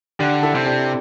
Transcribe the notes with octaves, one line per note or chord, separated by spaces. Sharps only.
D3 D4 G4
E4 A4
C3
D4 G4